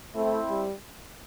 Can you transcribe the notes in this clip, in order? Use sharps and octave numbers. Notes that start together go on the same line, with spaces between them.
A3 C4 E4
G3